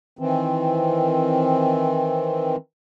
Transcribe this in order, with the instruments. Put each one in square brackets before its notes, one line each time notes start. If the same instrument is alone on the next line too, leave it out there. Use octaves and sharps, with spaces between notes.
[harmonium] D#3 E3 C4